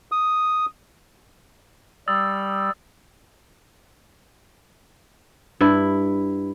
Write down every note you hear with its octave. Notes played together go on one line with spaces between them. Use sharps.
D#6
G3 D#6 E6 A6
G2 E4